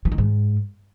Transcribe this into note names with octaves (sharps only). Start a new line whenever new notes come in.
E3
D#3
G#2